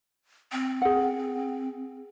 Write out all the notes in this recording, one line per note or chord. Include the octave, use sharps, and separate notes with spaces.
C4
G#4 F#5